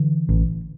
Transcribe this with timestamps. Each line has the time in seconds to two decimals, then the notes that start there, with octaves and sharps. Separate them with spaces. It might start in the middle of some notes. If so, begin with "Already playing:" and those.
Already playing: D3 E3
0.29 A1